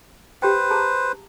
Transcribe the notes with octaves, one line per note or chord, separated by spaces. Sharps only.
G4 B4 C5 G5
G#4 A5 A#5